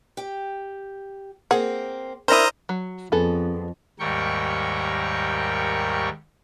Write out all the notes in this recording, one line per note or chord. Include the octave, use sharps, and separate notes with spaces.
G4 G5
A#3 C4 G#4 F#5
D4 E4 A#4 C5 A#5 D#6
F#3
F2 B3 G#4 A4
D#2 G#2 G3 A#4 G5 C#6